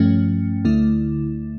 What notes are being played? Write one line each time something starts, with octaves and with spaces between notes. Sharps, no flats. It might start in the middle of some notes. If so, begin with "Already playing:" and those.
Already playing: G2 F3 A3 C#4
D2 D3 A3 E4